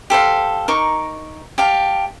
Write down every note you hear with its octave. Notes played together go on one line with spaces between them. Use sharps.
G4 A4 C5 F5
D#4 A#4 C#6 D6
G4 F5 A5